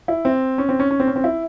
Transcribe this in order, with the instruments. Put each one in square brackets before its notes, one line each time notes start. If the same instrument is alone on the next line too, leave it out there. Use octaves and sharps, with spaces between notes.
[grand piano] E4
C4
C#4
C4
C#4
C#4
C4
C#4
C4
E4